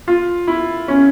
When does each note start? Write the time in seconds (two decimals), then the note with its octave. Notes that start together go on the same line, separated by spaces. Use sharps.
0.08 F4
0.48 E4
0.88 C#4